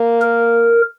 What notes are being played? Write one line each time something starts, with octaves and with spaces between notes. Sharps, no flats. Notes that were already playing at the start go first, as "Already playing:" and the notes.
Already playing: A#3
A#4